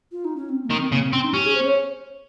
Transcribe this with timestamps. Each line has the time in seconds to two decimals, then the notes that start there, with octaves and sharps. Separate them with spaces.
0.12 F4
0.25 D#4
0.36 C#4
0.49 C4
0.64 A#3
0.70 D#3
0.78 C4
0.92 C#3 A#3
1.03 C4
1.13 C4 C#4
1.24 D#4
1.34 C#4 G4
1.44 G#4
1.55 C5
1.66 C#5